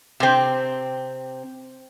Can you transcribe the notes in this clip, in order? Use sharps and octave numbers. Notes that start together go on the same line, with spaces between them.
C3 C4